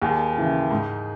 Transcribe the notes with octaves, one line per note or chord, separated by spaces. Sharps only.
D#2 G#4
C#3 E3
G#2